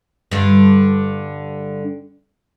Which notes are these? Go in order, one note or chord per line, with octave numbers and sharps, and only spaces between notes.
G2 D3